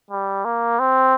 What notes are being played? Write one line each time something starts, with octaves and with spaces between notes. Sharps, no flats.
G3
A#3
C4